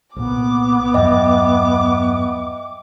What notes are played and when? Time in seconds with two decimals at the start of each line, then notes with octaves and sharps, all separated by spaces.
0.16 C2 A#2 B3 D6
0.94 E2 G2 F#3 D#5 E5 G5